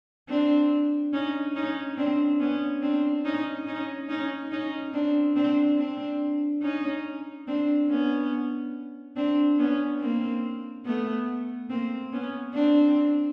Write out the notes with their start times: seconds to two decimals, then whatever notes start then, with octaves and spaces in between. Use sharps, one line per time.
0.29 C4 D4
1.13 C#4 D#4
1.55 C#4 D#4
1.97 C4 D4
2.40 B3 C#4
2.82 C4 D4
3.25 C#4 D#4
3.67 C#4 D#4
4.09 C#4 D#4
4.51 C#4 D#4
4.93 C4 D4
5.36 C4 D4
5.78 C4 D4
6.62 C#4 D#4
7.48 C4 D4
7.90 B3 C#4
9.16 C4 D4
9.59 B3 C#4
10.01 A#3 C4
10.85 A3 B3
11.70 A#3 C4
12.13 B3 C#4
12.54 C4 D4